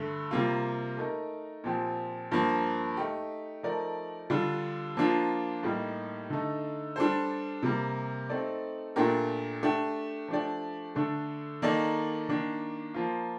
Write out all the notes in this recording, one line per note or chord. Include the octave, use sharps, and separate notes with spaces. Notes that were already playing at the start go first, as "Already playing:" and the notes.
Already playing: G2 D3 A3
C3 G3 A#3 F4
A3 D#4 A#4
A#2 F3 C4 G4
G2 F3 A#3
A3 D#4 G4
F3 A3 D#4 A#4 D5
D3 G3 D4 F4
F3 A#3 D4 F4
A2 G3 A#3 D#4 G4
D3 A3 D#4
G3 D4 A4 C5
C3 G3 A#3
A3 C4 D#4 A4 D5
A#2 A3 D4 G4 A#4
A3 D4 G4
F3 A3 D4 G4 D5
D3 A3 D4
D#3 A#3 D#4 A4 D5
D#3 A#3 D4
F3 A#3 F4